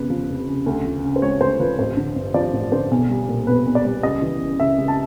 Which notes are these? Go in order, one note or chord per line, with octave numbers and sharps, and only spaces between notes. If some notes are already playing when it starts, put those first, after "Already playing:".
Already playing: F1 E2 C#3 B4
F3
F1
C#3
D2
F3
C#3
C5
G#3 C#5
D2 C5
F3 B4
A1 C5
D3
G2
F3 D5
A1
D3 C5
B1
G3
A#2
B1 B4
B1
D5
G3
C#2 D#5
E3
C#3
C#2 E5
C#2
A5